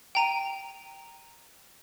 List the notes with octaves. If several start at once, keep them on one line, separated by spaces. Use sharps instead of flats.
G5 A#5 D#7